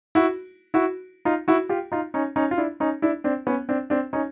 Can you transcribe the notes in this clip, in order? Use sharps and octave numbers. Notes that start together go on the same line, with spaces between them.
E4 F#4
E4 F#4
D#4 F4
E4 F#4
F4 G4
D#4 F4
C#4 D#4
C#4 D#4
F4
D4 E4
C#4 D#4
D4 E4
C4 D4
B3 C#4
C4 D4
C4 D4
C#4 D#4